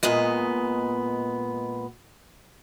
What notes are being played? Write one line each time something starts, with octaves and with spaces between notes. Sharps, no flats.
A#2 G#3 B3 D#5